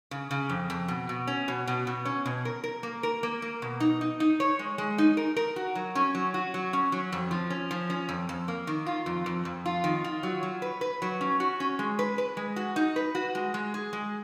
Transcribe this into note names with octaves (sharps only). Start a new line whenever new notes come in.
C#3
C#3
F2
F2
B2
B2
C#4
B2
B2
B2
C#4
B2
A#4
A#4
A#3
A#4
A#3
A#3
B2
D#4
D#4
D#4
C#5
G#3
G#3
D#4
A#4
A#4
F#4
F#3
C#4
F#3
F#4
F#3
C#4
F#3
F2
F3
C#4
F3
C#4
F2
F2
A#3
D#3
F4
F2
F2
F2
F4
D#3
F4
F#3
F#3
B4
B4
F#3
C#4
F#4
C#4
G#3
B4
B4
G#3
F#4
D#4
B4
F#4
G#3
G#3
G#4
G#3